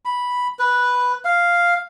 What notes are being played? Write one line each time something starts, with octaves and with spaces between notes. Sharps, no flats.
B5
B4
F5